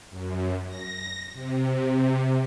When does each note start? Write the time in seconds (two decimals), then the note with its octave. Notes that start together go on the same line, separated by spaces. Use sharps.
0.11 F#2
0.67 A#6
1.33 C3